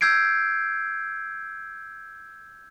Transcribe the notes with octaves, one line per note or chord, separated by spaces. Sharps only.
E6 G6 G#6 C7 D7